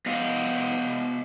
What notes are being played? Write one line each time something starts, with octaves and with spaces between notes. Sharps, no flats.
B3 D#5 F5